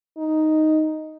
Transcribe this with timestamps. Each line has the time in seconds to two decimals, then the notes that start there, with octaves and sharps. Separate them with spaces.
0.18 D#4